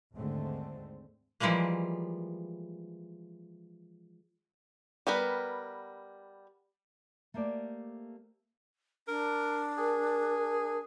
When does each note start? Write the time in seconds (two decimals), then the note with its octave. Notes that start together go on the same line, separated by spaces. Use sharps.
0.15 D#2 G#2 D3 G#3 A3 C4
1.40 E3 F3 G3 G#3 A#3
5.07 G3 B3 A#4 B4
7.34 A3 A#3 G4 C5 D5
9.08 D4 A#4
9.78 G#4 A#4